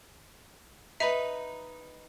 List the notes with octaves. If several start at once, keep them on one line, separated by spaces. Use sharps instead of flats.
D#4 B4 E5